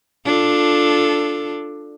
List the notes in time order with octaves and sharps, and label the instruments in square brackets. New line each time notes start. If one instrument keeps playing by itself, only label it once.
[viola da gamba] D4 F4 A4